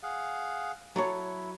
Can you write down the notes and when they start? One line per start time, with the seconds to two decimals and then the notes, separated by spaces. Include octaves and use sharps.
0.03 G#4 F5 F#5
0.96 F#3 E4 A4 C#5